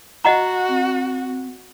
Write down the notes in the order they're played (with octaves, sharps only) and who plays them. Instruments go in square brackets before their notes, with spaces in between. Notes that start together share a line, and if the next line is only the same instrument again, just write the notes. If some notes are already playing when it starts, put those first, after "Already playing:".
[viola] F#4 [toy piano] D#5 F#5 A#5
[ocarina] C4